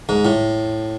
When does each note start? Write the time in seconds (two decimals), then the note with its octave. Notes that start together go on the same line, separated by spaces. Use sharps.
0.09 G#2
0.25 A2